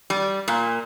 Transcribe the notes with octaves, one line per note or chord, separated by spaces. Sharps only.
G3
A#2